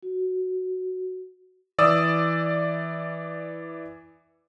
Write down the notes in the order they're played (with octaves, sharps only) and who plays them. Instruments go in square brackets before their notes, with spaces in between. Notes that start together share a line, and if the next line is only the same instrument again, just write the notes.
[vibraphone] F#4
[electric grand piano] E3 D5 D#6 E6